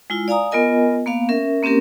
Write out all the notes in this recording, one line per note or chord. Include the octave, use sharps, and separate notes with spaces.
G#3 E4 F4
D5 F5 G#5 A#5 D#6
B3 F4 A#4 D#5 G#5
A#3 B3 F5
C#4 A#4 E5
A#3 C4 C#4 G4 A#4